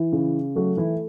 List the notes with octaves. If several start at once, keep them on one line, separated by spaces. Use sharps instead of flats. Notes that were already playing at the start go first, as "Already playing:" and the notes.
Already playing: E3 E4
C#3
F#3 A3 F#4
E3 E4